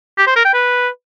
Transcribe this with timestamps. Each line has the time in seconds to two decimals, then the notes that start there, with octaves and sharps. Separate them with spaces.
0.18 G4
0.27 C5
0.36 A#4
0.45 G5
0.54 B4